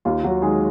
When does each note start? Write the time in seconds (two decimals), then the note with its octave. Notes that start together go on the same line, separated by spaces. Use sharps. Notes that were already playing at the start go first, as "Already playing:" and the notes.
0.05 D#2 F4
0.24 D#2 F#3 F#4
0.42 D#3 G#3 G#4